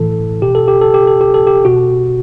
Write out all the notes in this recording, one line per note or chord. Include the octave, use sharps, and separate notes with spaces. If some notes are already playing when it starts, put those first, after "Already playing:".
Already playing: A2 E3 A4
B2 G4
A4
G4
A4
G4
A4
G4
A4
G4
B2 F#4